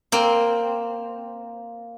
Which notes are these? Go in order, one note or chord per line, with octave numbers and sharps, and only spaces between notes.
A#3 C4